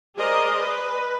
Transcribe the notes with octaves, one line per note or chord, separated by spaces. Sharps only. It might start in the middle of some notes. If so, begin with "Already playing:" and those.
G#4 A#4 C5 D5 D#5
B4